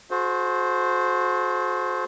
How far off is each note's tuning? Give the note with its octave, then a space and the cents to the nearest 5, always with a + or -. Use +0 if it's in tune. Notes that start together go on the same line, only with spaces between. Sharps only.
F#4 -30 A4 -45 C5 +0